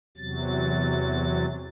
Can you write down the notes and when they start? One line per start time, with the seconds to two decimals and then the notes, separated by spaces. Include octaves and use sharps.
0.18 E2 C3 F#3 A6